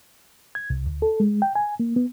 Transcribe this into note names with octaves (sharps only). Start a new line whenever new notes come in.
G#6
C2
D2
A4
G#3
G5
G#5
A#3
B3